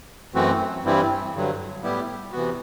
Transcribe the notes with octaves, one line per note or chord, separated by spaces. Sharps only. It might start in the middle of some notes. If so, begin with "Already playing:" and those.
F#2 E3 A3 C4 F#4
G2 E3 G3 C4 E4
G2 D3 F#3
A2 G3 B3 E4 G4
C3 E3 B3 F#4